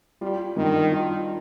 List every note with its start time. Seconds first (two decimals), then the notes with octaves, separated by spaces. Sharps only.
0.21 G3 F4
0.57 G2 D#3
0.92 F4